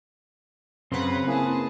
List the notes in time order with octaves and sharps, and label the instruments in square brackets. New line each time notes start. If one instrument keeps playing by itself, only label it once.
[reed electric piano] F#2 [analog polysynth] C#3 B4 [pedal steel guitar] C4 C6 [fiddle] F#5 A#5
[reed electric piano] A#3 E4 [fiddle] G#4 A5